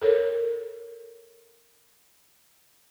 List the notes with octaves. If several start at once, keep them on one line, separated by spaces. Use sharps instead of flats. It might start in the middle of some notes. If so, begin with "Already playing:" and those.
A4 A#4 C#5